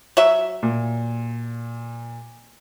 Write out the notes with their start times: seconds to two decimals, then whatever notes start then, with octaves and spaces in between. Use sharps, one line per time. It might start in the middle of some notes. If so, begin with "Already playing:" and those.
0.17 F#3 E5
0.63 A#2